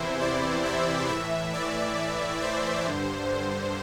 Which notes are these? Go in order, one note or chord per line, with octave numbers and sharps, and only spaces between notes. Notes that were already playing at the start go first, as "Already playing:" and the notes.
Already playing: E2 C3 E3 E4 C5
D5
E5
A2 E3 E5
D5
C5
G2 D3